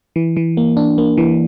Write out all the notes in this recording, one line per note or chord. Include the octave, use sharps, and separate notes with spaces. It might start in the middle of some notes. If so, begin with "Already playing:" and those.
E3
E3
A#3
D4
A#3
E3